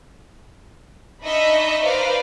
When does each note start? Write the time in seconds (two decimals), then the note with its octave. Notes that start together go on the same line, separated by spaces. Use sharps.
1.21 D4 D#4 D#5 E5 B5 C#6
1.83 B4 C5 D5 F5 A#5